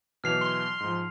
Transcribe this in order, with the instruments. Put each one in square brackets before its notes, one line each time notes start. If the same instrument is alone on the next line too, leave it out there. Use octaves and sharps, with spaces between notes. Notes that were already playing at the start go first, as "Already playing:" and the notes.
[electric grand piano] B2 E3 F#3 [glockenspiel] F6 C7 F7
[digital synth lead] C6
[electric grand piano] G#2 F3